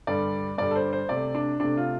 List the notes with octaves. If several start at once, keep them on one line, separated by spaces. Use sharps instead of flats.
G2 D3 G3 D5
G2 D3 G3 D5
A4
C5
C5
C3 A3 D5
D4
C3 A3 D4
F4